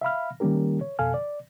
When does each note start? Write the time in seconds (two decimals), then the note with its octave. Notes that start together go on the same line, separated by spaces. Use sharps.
0.01 E5 F5 B5 F6
0.40 D#3 G3 A#3 C#4 G4 A#4
0.81 C#5
0.99 F2 B2 A4 F5 G#5 F6
1.14 D5